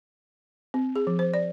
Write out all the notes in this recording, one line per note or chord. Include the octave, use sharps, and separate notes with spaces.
C4
G#4
F3
C5
D5